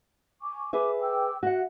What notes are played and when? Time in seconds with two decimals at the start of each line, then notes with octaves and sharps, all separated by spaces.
0.42 G#5 C#6 D6
0.73 G#4 B4 E5 D6
0.99 G5 D6 E6
1.43 F#4 E5 F#5